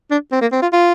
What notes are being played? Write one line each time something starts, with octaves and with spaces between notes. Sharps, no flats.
D4
C4
A#3
C4
F4
F4